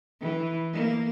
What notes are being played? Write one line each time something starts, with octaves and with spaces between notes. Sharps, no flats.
E3
A#3